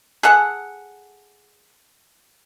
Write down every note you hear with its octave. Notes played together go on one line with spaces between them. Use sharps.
G#4 A4 F#5